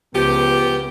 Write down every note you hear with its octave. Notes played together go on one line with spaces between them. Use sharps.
C#2 F3 B3 G4